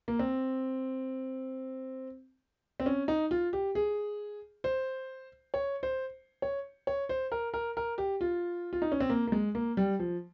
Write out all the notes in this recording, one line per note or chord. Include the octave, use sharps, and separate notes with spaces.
A#3
C4
C4
C#4
D#4
F4
G4
G#4
C5
C#5
C5
C#5
C#5
C5
A#4
A#4
A#4
G4
F4
F4
D#4
C#4
C4
A#3
A#3
G#3
A#3
G3
F3